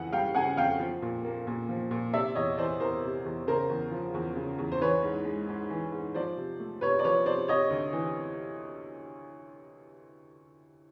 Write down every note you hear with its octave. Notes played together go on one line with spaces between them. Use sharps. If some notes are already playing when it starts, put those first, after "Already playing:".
Already playing: F2 C#3 E3 F#5
G3 F5 G5
C#3 F#5 G#5
F2 F5 G5
F3
A#2
A#3
A#2
F3
A#2
C3 D5 E5
E2 C#5 D#5
E3 C5 D5
E2 A#4 C5
C3
E2
C#3 A#4 C5
E2
F3
E2
C#3
E2
C5
E3 B4 C#5
G#2
G#3
G#2
E3
G#2
F3 C5 D5
C3
A3
C3 B4 C#5
D5
F3 B4 C#5
C3 C5 D5
C3 C#5 D#5
D2
E3